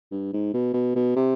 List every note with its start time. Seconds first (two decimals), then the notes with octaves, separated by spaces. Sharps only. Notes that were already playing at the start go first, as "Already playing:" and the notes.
0.11 G2
0.33 G#2
0.54 B2
0.74 B2
0.95 B2
1.16 C3